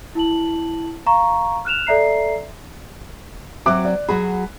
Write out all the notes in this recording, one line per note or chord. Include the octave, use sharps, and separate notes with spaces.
E4 A5 F#7
F5 A#5 C#6
F6 F#6 E7 F7
A4 D5 E5 A#5 C7
F#3 C4 E5 D6 F#6
D5
F#3 F#4 G#4 B5